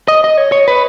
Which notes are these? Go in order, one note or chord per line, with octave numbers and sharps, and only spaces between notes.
D#5
D#5
C#5
C#5
B4